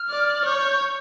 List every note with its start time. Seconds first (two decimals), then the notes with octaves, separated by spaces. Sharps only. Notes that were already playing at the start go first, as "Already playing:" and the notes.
Already playing: F6
0.10 D5
0.46 C#5 G6